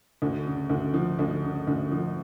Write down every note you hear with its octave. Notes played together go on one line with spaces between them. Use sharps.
D2
C#3
D2
F3
D2
C#3
D2
F3